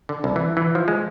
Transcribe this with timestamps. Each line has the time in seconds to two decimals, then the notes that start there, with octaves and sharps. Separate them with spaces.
0.09 D3
0.24 C2
0.36 E3
0.57 E3
0.75 F3
0.88 G#3